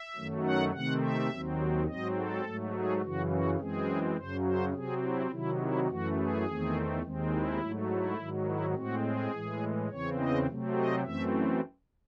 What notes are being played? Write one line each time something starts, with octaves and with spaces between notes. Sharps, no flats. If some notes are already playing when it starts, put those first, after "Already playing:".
Already playing: E5
F#2 D#3 F#3 A3
F#5
C3 D#3 A3 C4 F#5
E5
D#2 D#3 F#3 C4
G#2 F#3 C4 D#5
A4
G#2 F#3 A3
G#4
F#2 C#3 E3 F#4
F#4
F#2 E3 G#3 C4 G#4
F#2 C#3 F#3 C5
C5
C3 F#3 C4 G#4
E4
C3 D#3 F#3 E4
E4
F#2 E3 A3 F#4
G#4
E2 D#3 A3 C4
D#2 D#3 G#3 C4
E4
G#2 F#3 A3
E4
G#2 D#3 F#3
E4
A2 G#3 C4 F#4
G#4
A2 E3 G#3
E2 C#3 E3 C4 C#5
D#5
C3 F#3 A3 C4
D#5
F#2 E3 A3 C4 E5